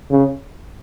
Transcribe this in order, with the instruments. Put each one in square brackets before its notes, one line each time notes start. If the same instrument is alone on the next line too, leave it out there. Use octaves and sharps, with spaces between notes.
[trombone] C#3